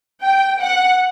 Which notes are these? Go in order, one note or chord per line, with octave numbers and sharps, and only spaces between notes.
G5
F#5